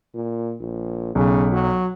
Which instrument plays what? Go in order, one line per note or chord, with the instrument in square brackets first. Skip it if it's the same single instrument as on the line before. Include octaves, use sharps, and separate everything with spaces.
[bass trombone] A#2
A#1
[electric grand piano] B1 [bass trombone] C#3
[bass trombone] F#3